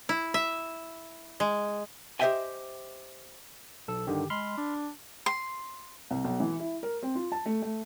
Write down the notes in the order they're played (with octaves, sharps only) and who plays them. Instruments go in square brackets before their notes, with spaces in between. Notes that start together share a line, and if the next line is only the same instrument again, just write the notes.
[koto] E4
E5
G#3
[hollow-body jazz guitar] G4 C5 D#5 E5 G5 G#5
[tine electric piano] B1 A4 E6
[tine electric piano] G2 D3 D#3 [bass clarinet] G4
[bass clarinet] G#3 [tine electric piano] B5 C6 F6
[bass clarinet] D4
[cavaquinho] C6
[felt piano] C2
B1
E3
E4
A#4
C4
F4
A5
A3
A3